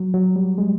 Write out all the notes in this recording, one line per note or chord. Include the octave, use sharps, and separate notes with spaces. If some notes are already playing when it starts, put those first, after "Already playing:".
Already playing: F#3
F#3
G3
G#3